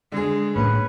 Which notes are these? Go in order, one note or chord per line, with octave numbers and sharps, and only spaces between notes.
D3 G#3 G#4
A#1 A2 A#3 C#4 B4